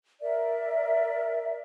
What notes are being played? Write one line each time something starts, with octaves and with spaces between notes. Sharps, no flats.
A#4 D5 E5